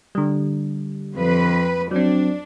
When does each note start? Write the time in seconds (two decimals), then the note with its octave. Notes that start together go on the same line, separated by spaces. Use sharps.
0.15 D3 G3
1.15 F2 B4
1.91 F#3 C4 D4